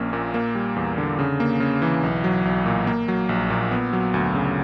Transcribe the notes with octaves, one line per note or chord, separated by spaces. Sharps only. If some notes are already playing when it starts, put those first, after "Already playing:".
Already playing: A#1 A#3 C#4
A#2
A#3
G3
E2
D3
C#3
A#3
C#3
E3
B1
F#3
B1
A#2
A#3
F#3
A#1
A#2
B3
F#3
D2
C#3